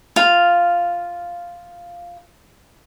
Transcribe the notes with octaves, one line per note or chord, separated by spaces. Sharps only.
F4 F5